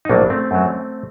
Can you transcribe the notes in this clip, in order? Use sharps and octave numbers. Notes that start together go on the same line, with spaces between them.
D#4
A#1 A2 F#3 A#3 D4
A3 C4
F#2 F#3